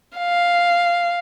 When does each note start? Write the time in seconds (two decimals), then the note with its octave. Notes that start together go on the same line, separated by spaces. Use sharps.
0.18 F5